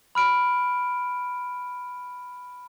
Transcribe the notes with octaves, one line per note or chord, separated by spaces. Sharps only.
B5 F6 D7